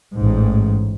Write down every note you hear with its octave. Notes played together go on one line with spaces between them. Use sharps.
A1 G#2